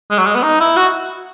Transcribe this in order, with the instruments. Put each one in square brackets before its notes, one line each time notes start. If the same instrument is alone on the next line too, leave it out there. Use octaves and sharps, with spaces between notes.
[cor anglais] G#3
F#3
G#3
B3
D#4
E4
F#4